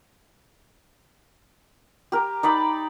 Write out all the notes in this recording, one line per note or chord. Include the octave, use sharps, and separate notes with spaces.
G4 A#4
D#4 D5 B5